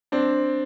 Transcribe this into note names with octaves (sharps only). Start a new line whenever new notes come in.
C4 D4